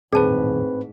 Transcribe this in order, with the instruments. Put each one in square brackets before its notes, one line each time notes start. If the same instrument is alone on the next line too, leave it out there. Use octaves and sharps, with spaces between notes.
[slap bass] D#1 F2 [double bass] A1 G#2 [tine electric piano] C4 B4 [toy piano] G#4 A5